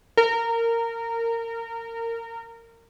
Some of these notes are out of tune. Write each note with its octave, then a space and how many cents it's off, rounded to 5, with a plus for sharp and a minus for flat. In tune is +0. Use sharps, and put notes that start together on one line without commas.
A#4 -20